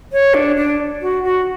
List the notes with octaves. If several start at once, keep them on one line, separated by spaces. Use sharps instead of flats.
C#5
D4
D4
F#4
F#4